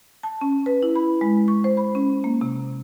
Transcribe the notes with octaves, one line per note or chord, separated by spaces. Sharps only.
A5
C#4
B4
E4
B5
G#3
C#6
C5
B5
C#4
A#3
C3